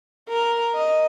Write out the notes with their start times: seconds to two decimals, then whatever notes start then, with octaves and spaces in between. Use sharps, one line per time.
0.29 A#4
0.75 D#5